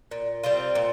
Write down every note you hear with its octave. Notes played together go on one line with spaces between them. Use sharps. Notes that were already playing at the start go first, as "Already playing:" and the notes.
A#2
G3 C4 F4
A#2